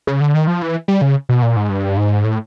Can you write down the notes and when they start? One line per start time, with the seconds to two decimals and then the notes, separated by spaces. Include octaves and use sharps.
0.07 C#3
0.21 D3
0.34 D#3
0.47 F3
0.62 E3
0.88 G3
1.01 C#3
1.29 B2
1.42 A#2
1.56 G#2
1.69 G2
1.97 G#2
2.24 A2